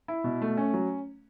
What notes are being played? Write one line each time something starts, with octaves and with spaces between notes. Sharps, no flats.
E4
B2
A3
C#4
F#3